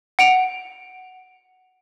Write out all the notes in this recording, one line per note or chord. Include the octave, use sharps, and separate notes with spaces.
F#5 D7 F7